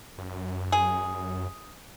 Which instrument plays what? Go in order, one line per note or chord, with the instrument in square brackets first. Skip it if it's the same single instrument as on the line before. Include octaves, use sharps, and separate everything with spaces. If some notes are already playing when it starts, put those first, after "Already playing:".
[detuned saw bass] F#2
[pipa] G#4